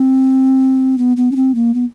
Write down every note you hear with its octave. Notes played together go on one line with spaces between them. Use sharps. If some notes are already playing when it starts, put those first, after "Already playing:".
Already playing: C4
B3
B3
C#4
C4
A#3
B3